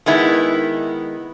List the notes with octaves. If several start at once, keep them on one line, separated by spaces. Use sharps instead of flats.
D#3 G#3 B3 E4